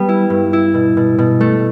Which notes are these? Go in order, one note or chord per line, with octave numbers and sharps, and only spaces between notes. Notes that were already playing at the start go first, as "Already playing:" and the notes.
Already playing: G3 B3
E4
G2
E4
B2
B2
B2
A3